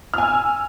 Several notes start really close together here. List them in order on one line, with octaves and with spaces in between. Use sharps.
F6 G#5 E6